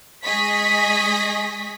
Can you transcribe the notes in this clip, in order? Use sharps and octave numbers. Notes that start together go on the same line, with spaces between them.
G#3 G#4 D#5 C#6 B6